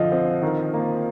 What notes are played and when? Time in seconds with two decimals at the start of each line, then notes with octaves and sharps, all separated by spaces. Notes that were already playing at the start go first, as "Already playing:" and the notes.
Already playing: D3 F3 D#5 F5
0.12 C4
0.43 D#3
0.74 A#3